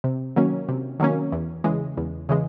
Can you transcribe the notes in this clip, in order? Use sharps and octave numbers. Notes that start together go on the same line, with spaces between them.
C3
D#3 F#3 A#3 C#4
C3
D#3 F#3 A#3 C#4
E2
C#3 E3 G#3
E2
C#3 E3 G#3